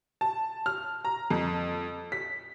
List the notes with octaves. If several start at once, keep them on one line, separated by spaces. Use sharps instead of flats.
A5
F6
A#5
F2
B6